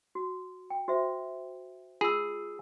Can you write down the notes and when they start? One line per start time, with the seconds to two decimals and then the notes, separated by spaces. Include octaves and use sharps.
0.15 F#4
0.70 G5
0.88 F#4 C5 E5
2.01 F4 G#4 E6